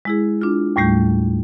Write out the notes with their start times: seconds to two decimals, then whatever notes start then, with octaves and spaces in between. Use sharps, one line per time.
0.05 G#3 E4 G#4
0.41 D4 F4
0.76 D#2 A2 G3 A3 G6